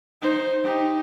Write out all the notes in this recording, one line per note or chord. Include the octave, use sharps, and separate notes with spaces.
D#4 C5
D#4 G4